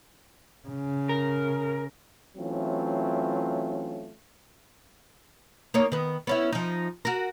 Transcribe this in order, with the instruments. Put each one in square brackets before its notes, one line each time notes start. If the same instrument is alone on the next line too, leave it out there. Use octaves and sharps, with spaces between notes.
[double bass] C#3
[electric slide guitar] A#4
[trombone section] E3 F#3 A3 C4 C#4 F4
[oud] A#3 D#4 C#5
D#3 B3
B3 C#4 E4
F3 D#4
F#4 A#4